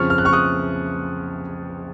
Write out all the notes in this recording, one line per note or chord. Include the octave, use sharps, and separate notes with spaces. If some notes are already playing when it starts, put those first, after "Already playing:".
Already playing: F2 C#3 F3 C#6 F6
F6
F#6
C#6 F6
D#6 F#6